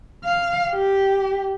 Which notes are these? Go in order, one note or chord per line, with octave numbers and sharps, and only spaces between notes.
F5
G4